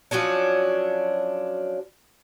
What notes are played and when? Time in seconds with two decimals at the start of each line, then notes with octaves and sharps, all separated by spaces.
0.11 F3 F#3 C#4 D4